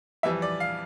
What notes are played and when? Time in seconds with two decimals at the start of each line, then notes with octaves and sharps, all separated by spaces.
0.23 F2 E3 G3 E5
0.42 D5
0.60 F5